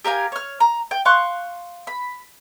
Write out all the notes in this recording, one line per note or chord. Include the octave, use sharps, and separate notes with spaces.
G4 A#4 F5 G#5
C#5 F6
A#5
G5
F5 C6 C#6 F#6
B5